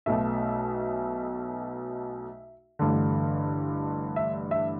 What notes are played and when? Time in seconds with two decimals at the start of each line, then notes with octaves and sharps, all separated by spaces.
0.06 B1 B2 A3 E5
2.79 A1 G2 D3
4.16 E5
4.51 E5